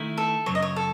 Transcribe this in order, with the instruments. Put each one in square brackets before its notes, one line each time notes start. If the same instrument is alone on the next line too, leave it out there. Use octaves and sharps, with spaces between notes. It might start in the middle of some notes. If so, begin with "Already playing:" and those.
Already playing: [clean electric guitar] D#3 A3 E4
[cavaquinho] A4
[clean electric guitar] F#2 C#3 F#3 [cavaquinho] C#5
[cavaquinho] D#5
C#5
A4